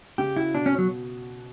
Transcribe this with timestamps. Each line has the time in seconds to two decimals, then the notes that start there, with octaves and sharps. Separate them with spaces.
0.18 C#3 G4
0.37 E4 F#4
0.54 B2 D4
0.66 C#4
0.72 B2
0.78 F#3